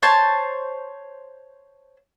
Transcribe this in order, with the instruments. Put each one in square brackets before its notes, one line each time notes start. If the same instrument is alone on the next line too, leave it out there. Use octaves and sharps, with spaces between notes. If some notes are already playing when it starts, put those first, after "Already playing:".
[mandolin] C5 C#5 A5 C6